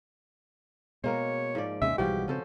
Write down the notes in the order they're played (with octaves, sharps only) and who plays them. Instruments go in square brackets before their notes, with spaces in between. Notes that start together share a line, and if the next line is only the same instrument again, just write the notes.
[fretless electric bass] B2 [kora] G#3 A#3 A#4 [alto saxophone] C#5
[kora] G#2 F3 D5
[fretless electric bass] D#2 C3 C#4 [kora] G#3 [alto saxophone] E5
[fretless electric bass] B1 E3 G3 [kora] B2 F3 F#4 [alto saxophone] G4
[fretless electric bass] C#3 C4 [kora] C#4 A4 C5